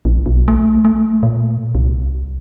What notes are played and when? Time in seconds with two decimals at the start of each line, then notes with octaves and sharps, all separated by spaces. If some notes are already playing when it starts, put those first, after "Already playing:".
0.05 A#1
0.26 B1
0.48 A3
0.85 A3
1.23 A#2
1.75 C2